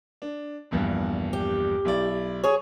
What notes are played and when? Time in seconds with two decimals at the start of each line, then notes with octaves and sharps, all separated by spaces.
0.22 D4
0.71 A#1 E2 G2
1.33 G4
1.85 B1 E4 D5
2.44 G#4 C#5